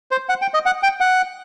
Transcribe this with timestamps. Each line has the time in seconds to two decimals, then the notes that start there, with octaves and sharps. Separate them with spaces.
0.11 C5
0.29 F#5
0.42 G5
0.54 D#5
0.66 F#5
0.83 G5
1.00 F#5